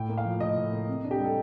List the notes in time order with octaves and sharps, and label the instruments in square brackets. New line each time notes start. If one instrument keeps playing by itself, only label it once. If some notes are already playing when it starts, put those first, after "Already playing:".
Already playing: [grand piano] A2 G5
A#3
F5
F3
A2 D#5
A2
A#3
C3
D4
G4
G3 A4